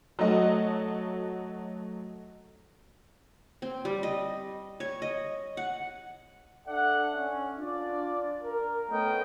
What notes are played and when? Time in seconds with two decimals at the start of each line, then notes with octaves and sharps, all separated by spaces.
0.19 F#3 A3 F#4 D#5
3.62 C4
3.85 G3
4.03 D#5
4.80 C#5
5.02 D#5
5.57 F#5
6.66 D4 A4 D5 E5 F#5
7.14 C#4
7.57 D4 F4 D5
8.41 A#4
8.89 A3 B3 C#4 A#4 D#5 G5